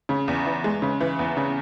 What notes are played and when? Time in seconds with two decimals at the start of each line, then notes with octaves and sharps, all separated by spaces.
0.09 C#3
0.28 E2
0.46 E3
0.64 G#3
0.82 C#3
1.01 E3
1.19 E2
1.37 C#3